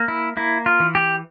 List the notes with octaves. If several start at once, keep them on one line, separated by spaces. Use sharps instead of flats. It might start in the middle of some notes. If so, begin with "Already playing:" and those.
Already playing: A#3
E4
A#3 E4
F4
E3
G4